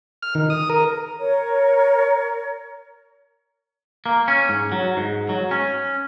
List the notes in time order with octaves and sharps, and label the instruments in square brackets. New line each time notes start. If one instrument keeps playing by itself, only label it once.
[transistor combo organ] F6
D#3
D#6
A#4
[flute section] A#4 C#5
[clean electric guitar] A#3
C#4
G#2
F#3
G#2
F#3
C#4